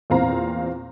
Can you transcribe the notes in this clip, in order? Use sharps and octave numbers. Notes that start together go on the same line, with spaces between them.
E2 A#2 C4 F5 A#5